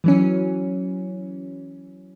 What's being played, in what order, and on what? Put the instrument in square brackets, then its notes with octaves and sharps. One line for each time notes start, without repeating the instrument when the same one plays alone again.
[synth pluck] E3 F#3 C#4